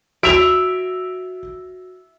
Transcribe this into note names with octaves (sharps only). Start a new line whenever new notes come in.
F#4 E5 D7 F7